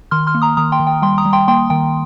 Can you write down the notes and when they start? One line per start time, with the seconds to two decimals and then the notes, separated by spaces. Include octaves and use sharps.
0.11 D#3 C6 F6
0.27 C6 F6
0.35 A#3
0.42 A#5 D#6
0.57 D#3 A#5 D#6
0.72 G5 C6
0.80 D#3
0.87 G5
1.02 G3 G5 C6
1.18 A#5 D#6
1.25 G3
1.33 G5 C6
1.48 A#3 G5 C6
1.70 D#3 G5